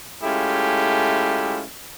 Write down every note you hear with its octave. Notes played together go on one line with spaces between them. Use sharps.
G#3 A3 C#4 E4 F4 G4